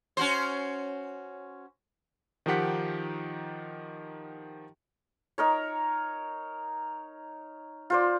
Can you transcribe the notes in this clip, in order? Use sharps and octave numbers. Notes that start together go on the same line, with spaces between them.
C#4 F#4 C5
D#3 F3 D#4 G4 F#5 B6
D#4 A#4 C#5
F4 C5 D5